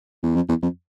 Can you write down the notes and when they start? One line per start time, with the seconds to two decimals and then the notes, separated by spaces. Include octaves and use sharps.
0.23 E2
0.35 F2
0.49 E2
0.63 F2